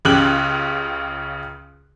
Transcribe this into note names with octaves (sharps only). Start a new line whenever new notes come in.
C#2 C#3 G4 F#6 F#7